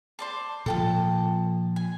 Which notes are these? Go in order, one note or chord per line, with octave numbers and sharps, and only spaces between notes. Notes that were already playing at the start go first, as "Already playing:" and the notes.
C5 D5 A5
A#2 F3 A4 G5 A5
G#5